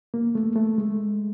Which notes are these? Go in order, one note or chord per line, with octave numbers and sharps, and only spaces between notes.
A#3
A3
A3
G#3